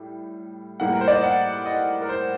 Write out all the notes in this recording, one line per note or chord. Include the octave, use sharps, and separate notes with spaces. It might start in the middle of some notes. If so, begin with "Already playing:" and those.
Already playing: A2 G3
A2 G3 A#3 F#5
A#4
C5
D5
D#5
F#5
D#5
A#4
C5